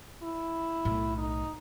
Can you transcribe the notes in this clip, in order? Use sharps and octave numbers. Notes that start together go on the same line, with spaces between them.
E4
B1 A2
D#4